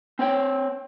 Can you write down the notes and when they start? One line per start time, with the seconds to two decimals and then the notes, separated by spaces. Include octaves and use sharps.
0.19 C4 C5 C#5 G5